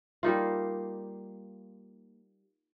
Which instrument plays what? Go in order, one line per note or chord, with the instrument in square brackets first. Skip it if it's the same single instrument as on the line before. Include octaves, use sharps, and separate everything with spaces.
[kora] G3 A#3 D#4 F4